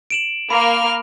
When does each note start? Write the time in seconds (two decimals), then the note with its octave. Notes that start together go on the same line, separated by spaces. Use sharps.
0.10 D7 E7 F#7
0.50 A#3 B5 F6